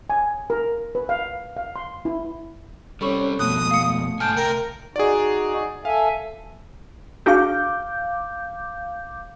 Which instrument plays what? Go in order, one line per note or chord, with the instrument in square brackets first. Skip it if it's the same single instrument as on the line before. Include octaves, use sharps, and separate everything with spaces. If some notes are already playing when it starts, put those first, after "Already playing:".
[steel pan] G#5
A#4
B4
F5
F5
C6
E4
[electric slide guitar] G3 C4 [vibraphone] C#4 C#5 [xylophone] A4 B5 C#6
[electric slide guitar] F2 B2 [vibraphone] A3 [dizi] D#6 [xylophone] F#6
[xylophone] F5 C#7
[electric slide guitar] G#2 A4 G#5 [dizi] A5 [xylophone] F6 G6 D7
[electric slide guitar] C3 E5 G5 [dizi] A#4
[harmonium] D#4 F#4 [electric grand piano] G#4 D5
[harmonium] A4 E5 G#5 [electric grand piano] F5
[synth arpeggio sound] D4 F#4 G#4 [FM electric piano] F5 D6 G6